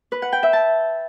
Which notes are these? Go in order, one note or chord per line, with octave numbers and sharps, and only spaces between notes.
B4
F#5
G5
E5
A5